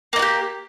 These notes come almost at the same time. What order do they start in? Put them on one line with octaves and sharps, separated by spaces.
A#3 D#4 F#4 G4